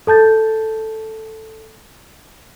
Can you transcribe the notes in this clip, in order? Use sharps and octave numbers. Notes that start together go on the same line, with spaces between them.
A4 A5 G6 A6